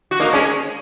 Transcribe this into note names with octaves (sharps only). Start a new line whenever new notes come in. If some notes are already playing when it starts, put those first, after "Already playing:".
F#4
A#3 D#4
G#3 C#4